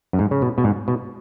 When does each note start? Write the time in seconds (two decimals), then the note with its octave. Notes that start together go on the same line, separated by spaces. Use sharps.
0.13 F#2
0.19 G#2
0.31 C#3
0.42 B2
0.58 B2
0.64 G#2
0.88 B2